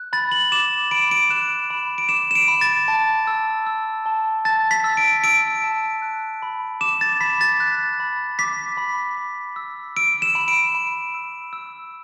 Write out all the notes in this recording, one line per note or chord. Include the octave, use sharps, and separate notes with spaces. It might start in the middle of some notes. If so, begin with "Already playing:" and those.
Already playing: F#6
B5 A6
F#7
D6 E7
B5 D7
D7
F#6 E7
B5
D7
D6 E7
E7
D7
B5
A6
A5
E6
E6
A5
A5 A6
B6
E6
D7
E6 D7
A5
F#6
B5
D6 E7
A6
B5 B6
A6
F#6
B5
D6 B6
B5
B5
E6
E6 D7
E7
B5
D7
B5
E6
E6